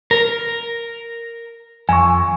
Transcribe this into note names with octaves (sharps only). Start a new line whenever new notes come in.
A#4
F2 G#5 C#6